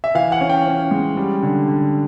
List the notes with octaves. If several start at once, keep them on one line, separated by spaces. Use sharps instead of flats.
E5
E3 F5
F#5
C#4
G5
C#4
G#3
G3
D3
D3